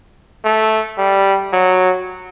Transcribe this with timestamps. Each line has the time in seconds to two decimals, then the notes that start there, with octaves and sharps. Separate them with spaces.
0.44 A3
0.98 G3
1.53 F#3